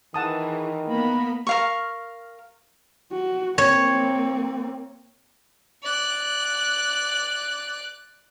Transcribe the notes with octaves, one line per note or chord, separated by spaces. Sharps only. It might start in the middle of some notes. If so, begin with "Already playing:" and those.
D#3 E3 G#4 F#5 A5 D#6
A#3 B3 A#4 B5
A#4 F5 C#6
F#4
A#3 C4 C#5
D5 F#6